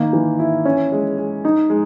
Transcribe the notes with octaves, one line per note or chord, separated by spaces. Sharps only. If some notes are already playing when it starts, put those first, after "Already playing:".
Already playing: D#3 A#3
E3
E4
C#4
G#3
G#3
D#4
G#3